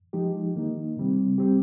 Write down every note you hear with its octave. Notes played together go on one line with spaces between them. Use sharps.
F3 G#3 D#4 G4
D#3 A#3 D#4
C3 G3 C4
G3 C4 G4